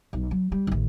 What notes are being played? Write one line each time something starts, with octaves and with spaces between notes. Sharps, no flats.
B1
F#3
G3
A1 D#3